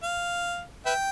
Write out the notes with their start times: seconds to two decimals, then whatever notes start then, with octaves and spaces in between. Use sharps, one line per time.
0.03 F5
0.86 B4 E5 G5